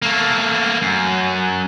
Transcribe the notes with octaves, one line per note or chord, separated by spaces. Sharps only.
A3 A#3
F#2